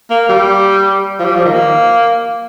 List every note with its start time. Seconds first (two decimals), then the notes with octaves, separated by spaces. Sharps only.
0.11 A#3
0.29 G3
1.20 F3
1.25 G3
1.36 F3
1.45 D#3
1.54 A#3